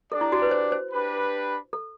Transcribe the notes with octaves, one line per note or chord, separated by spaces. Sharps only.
D4 G4 A4 D5
E4
F#4
B4
C5
C5
D4 G4 B4
A4